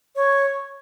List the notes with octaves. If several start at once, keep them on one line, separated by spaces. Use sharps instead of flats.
C#5